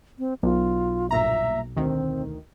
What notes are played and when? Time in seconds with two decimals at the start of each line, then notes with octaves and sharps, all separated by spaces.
0.19 C4
0.43 B1 F4
1.11 G1 A#2 E5 A#5
1.76 D2 D#3 C4